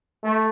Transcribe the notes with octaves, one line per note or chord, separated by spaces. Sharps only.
A3